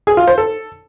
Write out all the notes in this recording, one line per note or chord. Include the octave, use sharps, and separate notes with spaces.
G#4
F4
C5
A4